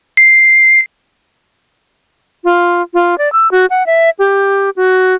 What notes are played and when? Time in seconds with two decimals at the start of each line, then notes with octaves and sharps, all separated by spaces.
0.17 C7
2.44 F4
2.94 F4
3.18 D5
3.33 E6
3.51 F#4
3.70 F#5
3.86 E5
4.19 G4
4.76 F#4